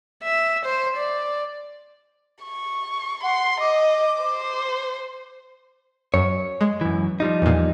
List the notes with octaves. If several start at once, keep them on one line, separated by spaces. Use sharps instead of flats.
E5
C5
D5
C#6
F#5 C6
D#5 D6
C5
F#2 C#5
G#3
F#2 E3
F3 G3 D#4
E2 A#2